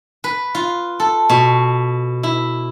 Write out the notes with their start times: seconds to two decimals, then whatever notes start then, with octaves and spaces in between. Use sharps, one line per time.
0.24 B4
0.55 F4
1.00 A4
1.29 B2
2.23 E4